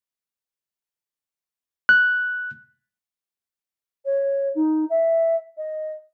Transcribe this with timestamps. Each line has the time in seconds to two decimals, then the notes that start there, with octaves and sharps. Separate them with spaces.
1.89 F#6
4.05 C#5
4.55 D#4
4.90 E5
5.57 D#5